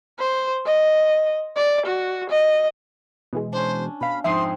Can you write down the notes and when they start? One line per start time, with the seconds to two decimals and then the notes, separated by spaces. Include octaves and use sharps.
0.19 C5
0.66 D#5
1.56 D5
1.86 F#4
2.30 D#5
3.33 B2 E3 G#3
3.53 C#4 D4 C5
4.01 B2 F5 B5
4.24 F2 G#2 C4 E5 C6 D#6 C7